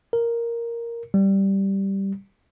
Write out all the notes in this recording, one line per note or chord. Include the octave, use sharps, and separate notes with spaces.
A#4
G3